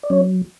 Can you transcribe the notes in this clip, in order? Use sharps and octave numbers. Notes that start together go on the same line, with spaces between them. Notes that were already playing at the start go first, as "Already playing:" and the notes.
D5
F#3 C#4 C#5